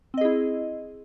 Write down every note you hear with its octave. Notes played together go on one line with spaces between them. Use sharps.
C4 E4 G#4 D#5